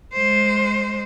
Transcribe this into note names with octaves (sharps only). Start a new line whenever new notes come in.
G#3 C5